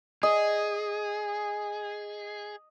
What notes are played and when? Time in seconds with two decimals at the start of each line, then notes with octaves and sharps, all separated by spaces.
0.23 G#4 D#5